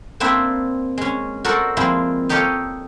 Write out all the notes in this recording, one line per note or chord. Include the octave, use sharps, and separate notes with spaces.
A#3 C4 D4 E4 E5
G#3 C#4
F#4 A4 A#4 C5 D5
F3 G#3 A#3 C4 E4
D#4 G4 A4 C#5 D#5 F5